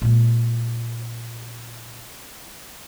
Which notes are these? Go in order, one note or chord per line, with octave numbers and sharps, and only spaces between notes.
A#2 G#3